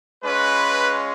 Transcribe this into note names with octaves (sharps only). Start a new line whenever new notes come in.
G#3 C#4 F4 B4